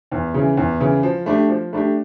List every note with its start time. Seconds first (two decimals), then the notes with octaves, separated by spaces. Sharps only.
0.12 E2
0.34 C#3 E3
0.57 E2
0.80 C#3 E3
1.03 F3
1.26 A3 D4 G4
1.49 F3
1.73 A3 D4 G4